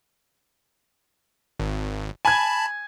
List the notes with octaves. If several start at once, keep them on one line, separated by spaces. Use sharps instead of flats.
G#1
G#5 A5 B5 G#6